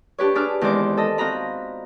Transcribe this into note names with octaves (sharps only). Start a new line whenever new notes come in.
D4 G4 B4 C#5
D4 G#4 B4 D6 F6
E2 D#3 G#3 C4 C5 D6
A4 D#5
C4 F4 F#4 D#5 A#5 B5